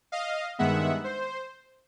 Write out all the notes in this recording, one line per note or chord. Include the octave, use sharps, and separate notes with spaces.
D#5 F5
G2 D#3 G#3 B3 E5 F#5
C5